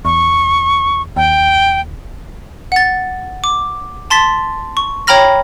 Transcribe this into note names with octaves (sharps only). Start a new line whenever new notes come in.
E2 C#6
D#2 G5
F#5 A6
D6
A5 C6 A6 B6
C#6
C#5 G5 A#5 B5 F6 A#6